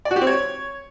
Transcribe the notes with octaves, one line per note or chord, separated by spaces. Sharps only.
D5
F#4
G4
C4
C#5